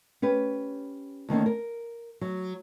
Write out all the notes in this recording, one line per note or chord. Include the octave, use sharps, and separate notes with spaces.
C#4 G4 B4
D2 D#3 A#3 C#4
A#4
F#3